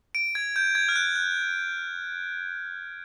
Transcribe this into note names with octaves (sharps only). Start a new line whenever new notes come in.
D7
G#6
G6
G#6
F6
F#6
F#6